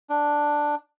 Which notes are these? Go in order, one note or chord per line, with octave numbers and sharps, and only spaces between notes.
D4